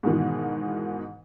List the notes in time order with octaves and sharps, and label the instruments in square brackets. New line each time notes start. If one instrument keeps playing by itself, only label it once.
[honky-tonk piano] G#2 B2 D#3 E3